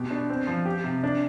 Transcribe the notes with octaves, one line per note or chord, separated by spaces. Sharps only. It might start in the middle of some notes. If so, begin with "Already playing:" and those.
Already playing: B2 G4
D4
C4
F3
G4
C3
D4